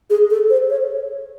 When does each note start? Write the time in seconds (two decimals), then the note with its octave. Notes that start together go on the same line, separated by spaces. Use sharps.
0.10 G#4
0.30 A4
0.50 C5
0.70 C#5